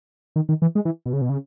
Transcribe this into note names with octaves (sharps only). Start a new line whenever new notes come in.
D#3
D#3
E3
G#3
E3
B2
C#3
B2
C#3